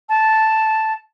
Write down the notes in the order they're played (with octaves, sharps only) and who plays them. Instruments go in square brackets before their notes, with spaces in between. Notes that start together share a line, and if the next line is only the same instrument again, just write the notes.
[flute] A5